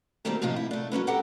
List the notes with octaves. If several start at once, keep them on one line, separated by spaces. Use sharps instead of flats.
B2 D#3 G3 A3 A#3 C4
A2 C3 F3 D#4 F4
E4
A3 D4
F#3 A3 C#4 B4
G4 A4 A#4 F#5 G5